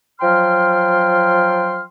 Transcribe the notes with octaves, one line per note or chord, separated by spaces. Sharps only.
F3 F#3 G5 C6 F6